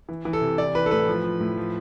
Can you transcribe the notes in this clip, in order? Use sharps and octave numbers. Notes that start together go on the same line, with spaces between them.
E3
E3
A4
C3
E3 D5
E3 B4
A4
A2 B4
F3
F3
A2
F3